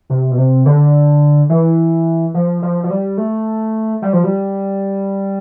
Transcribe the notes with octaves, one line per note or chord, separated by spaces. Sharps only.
C3
B2
C3
D3
E3
F3
F3
F3
G3
A3
G3
F3
G3